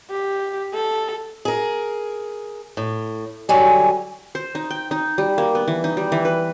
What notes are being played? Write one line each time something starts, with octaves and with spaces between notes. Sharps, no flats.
G4
A4
G#4 A#4
A2
D3 F#3 G3 G#5
C5
D#4
G5
D#4
G3
A#3
B3
E3
D#4
G3
E3
B4